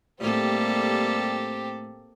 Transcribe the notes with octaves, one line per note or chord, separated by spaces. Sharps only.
A2 G3 A#3 C4 C#4 G4 A4